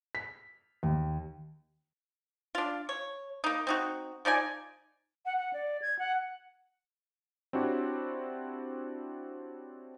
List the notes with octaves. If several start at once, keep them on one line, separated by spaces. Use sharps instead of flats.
B6
D#2
D4 F4
C#5
A#3 D#4
C4 D#4 F#4
F3 D#4 D5 G#5
F#5
F#5
D5
G#6
F#5
C4 D4 E4 F#4 G4 C#5